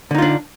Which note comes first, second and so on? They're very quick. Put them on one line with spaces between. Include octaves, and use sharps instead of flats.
D3 D#4 F4 D4